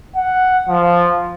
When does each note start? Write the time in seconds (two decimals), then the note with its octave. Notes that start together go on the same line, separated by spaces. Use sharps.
0.15 F#5
0.69 F3